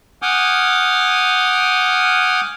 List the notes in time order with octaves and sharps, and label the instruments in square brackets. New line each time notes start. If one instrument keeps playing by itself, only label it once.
[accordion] F#5 G#5 D6 D#6 F6 G6